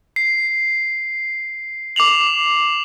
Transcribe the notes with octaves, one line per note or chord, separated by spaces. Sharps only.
C7
D6 C7 F7 F#7